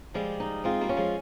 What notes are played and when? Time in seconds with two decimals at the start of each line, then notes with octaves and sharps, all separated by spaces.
0.15 F3 G3 G#3
0.40 D#4
0.64 G#3 C4 F4
0.81 G3 A#3
0.89 C#4
0.97 F3 G#3